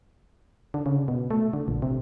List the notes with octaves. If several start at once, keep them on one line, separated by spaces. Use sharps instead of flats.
D3
C#3
B2
A3
D3
A#1
C3